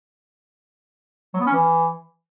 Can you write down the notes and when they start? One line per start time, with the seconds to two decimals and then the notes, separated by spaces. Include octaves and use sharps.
1.34 F#3
1.40 B3
1.46 C#4
1.53 E3